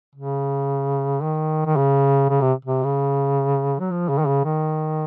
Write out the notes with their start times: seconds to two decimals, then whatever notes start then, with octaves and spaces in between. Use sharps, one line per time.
0.15 C#3
1.22 D#3
1.66 D#3
1.76 C#3
2.29 C#3
2.41 C3
2.65 C3
2.84 C#3
3.79 F#3
3.91 F3
4.09 C#3
4.19 D#3
4.27 C#3
4.45 D#3